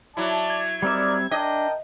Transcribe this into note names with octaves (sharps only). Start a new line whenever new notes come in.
F#3 E4 D5 A5
G#6
G3 C4 D#4 A#4 D5 E5
D4 A#4 D#5 G5 A5